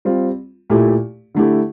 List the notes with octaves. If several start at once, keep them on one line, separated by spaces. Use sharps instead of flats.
G3 C4 F4
A#2 A3 E4 G4
D3 A3 E4 G4